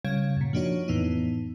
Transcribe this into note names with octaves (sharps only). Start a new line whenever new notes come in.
C#3 G3 C#5 F5 G#6
F#2 A#2
F3 A#3 D4 D#4 F#4 C#5
F2 A2 E3 B3 D#4